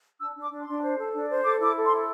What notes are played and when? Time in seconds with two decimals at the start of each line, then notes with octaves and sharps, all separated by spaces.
0.20 D4 E6
0.36 D4
0.41 D6
0.51 D4
0.61 C6
0.67 D4
0.82 C5
0.98 A4
1.14 D4
1.29 C5
1.44 A4 D6
1.59 E4
1.65 D6
1.76 A4
1.85 C6
1.92 E4